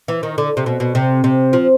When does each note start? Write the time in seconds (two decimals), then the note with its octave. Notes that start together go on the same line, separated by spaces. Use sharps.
0.08 E3
0.23 D#3
0.38 D3
0.57 C3
0.66 B2
0.80 B2
0.95 C3
1.24 C3
1.53 F3